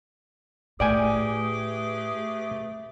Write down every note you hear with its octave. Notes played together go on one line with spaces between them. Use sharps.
A2 A3 G4 G#4 B4 D5 G5 G#5